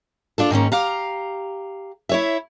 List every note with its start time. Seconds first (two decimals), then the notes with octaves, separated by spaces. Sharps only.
0.38 D4 F4 A4
0.50 G#2 D#3 A#3 C#4
0.72 G4 F5 A#5
2.09 E4 C#5 E5